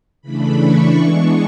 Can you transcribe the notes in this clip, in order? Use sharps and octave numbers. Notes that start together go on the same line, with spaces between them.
C#3 E3 A3 D4 B5
C#6
E3 G#3 B3 D4